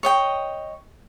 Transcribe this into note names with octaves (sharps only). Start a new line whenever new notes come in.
C#5 D#5 G5